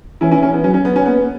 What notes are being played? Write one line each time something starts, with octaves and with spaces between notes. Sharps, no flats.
E3 C#4 E4
C#4 E4
C#4
B3
F#3 C#4
C#4
B3
C#4
A#3 B3